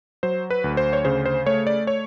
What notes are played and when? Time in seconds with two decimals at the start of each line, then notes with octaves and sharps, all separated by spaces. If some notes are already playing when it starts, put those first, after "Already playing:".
0.23 F#3 C5
0.50 B4
0.64 D2
0.77 C5
0.93 C#5
1.05 C#3 C5
1.26 C5
1.46 A3 C#5
1.67 D5
1.87 C#5